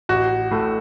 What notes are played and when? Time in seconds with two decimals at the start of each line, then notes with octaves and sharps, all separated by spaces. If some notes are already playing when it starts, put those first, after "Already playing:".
0.09 A1 F#4
0.51 A2 A3